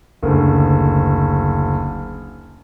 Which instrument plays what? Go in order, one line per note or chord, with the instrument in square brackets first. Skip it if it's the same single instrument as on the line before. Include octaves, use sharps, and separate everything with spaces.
[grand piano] F#1 D2